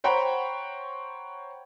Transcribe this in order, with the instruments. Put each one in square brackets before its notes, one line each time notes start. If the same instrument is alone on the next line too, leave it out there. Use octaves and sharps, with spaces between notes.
[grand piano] C5 C#5 F#5 G5 A#5 B5